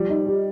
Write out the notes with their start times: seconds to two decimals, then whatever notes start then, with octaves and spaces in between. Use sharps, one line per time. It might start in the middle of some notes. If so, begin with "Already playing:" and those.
Already playing: F3 G3
0.10 D#4
0.26 G4